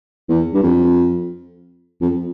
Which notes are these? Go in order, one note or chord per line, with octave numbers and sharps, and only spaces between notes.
E2
G2
F2
F2